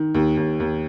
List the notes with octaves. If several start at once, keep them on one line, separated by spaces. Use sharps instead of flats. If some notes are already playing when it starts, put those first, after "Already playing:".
Already playing: D#3
D#2
D#2
D#2